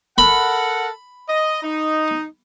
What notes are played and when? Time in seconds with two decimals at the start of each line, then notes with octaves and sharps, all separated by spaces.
0.18 A4 A#4 F#5 B5
1.29 D#5
1.63 D#4